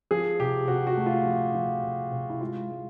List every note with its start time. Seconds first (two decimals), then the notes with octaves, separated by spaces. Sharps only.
0.11 F3 G#4
0.39 C3 G4
0.68 C3 F#4
0.87 F#4
0.97 A3
1.06 F4
1.25 F3
1.55 F3
1.83 C3
2.12 C3
2.30 E4
2.41 G#3 F4
2.70 G#3